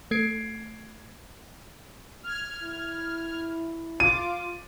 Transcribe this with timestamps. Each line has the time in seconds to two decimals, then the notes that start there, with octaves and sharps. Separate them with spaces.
0.11 A3 G#6 C7 D7
2.23 F6 G#6
2.63 E4
4.00 F4 D6 D#7